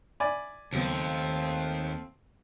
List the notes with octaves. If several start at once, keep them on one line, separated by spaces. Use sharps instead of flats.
D5 E5 G#5 B5
D#2 C#3 F#3 A3 B3 C4 F4